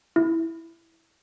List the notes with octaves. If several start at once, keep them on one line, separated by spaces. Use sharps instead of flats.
E4